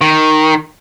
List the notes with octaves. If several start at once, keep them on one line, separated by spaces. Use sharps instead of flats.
D#3